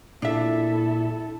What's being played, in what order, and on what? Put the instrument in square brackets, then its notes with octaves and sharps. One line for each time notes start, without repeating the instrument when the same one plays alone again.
[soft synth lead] A#2 [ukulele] D4 E5 [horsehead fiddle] E4 A4